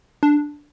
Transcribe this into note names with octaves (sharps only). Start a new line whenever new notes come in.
D4